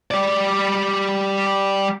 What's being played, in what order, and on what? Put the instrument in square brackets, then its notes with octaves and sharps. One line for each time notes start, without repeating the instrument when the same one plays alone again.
[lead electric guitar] G3 D5